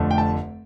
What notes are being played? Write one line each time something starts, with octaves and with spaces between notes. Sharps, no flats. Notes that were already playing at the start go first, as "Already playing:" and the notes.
Already playing: F1 F2 D3 A3
G5
A5